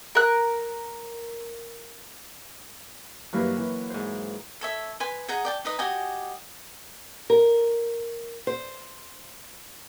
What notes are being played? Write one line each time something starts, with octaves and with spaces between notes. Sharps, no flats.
A#4 F#6
G2 E3 F#3 A#3 B4
E3
G#2 C5
A4 C#5 E5
B4 G#5 C6
G#4 D#5 F#5 A#5
D5 G5 A5
D#4 B4 D#5
F#4 G4 D#5 G#5
A#4
C5